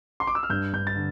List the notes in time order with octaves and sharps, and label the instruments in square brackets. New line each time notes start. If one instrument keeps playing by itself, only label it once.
[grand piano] C6
D6
E6
F6
G2 G6
G2 G6
A6
D3